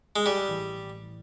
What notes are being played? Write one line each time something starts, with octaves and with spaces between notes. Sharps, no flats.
G#3
A1 G3
A2 E3